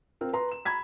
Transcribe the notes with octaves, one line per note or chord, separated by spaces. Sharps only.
C4 F4 A#4
B4 A#5 C6
E7
A#5 B5 G#6 B6